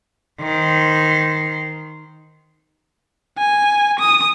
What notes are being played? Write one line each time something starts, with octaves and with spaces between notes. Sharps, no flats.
D#3 C5
G#5
D#6